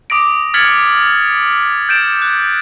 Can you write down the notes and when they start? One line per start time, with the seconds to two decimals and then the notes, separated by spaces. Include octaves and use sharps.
0.10 D6 D#6 A#6 D7
0.54 F6 G#6 A6 B6 C#7 F#7
1.89 G6 A6 D7 E7
2.22 F#6